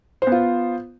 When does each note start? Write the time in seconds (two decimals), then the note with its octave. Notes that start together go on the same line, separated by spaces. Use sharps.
0.22 C5
0.27 B3
0.32 F4